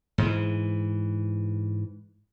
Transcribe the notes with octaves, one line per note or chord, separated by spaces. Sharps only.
G#2 E3